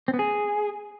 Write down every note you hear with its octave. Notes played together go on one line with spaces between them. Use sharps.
C4
B3
G#4